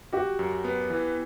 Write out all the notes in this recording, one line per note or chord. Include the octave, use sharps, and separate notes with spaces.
F#4 G4
F#2
B3
E3